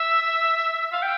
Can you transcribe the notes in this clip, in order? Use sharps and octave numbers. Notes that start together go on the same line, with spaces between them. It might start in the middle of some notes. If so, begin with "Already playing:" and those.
Already playing: E5
F5
G5